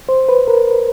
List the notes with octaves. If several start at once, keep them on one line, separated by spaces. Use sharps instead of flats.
C5
B4
A#4